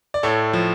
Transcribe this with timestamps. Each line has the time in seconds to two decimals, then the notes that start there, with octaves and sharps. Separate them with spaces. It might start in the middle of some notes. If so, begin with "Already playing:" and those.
0.14 D5
0.23 A2 A4 C#5
0.53 F3